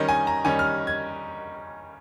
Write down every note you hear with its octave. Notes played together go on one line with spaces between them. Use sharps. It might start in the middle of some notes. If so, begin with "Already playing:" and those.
Already playing: D#3 G3 C#4 D#5
G#5
A#5
D#3 G3 C#4 G#5
F6
G#6